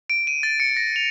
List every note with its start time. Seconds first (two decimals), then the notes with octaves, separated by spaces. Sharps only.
0.10 D7
0.27 D#7
0.43 A6
0.60 C#7
0.77 A#6
0.96 F7